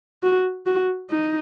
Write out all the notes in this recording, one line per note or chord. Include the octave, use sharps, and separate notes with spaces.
F#4
F#4
D#4